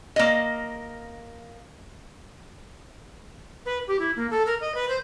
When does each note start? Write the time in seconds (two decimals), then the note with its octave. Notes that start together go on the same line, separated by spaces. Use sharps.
0.16 A#3 D#5
3.66 B4
3.88 G4
3.99 E4
4.16 A#3
4.31 A4
4.46 A#4
4.61 D#5
4.75 B4
4.89 C5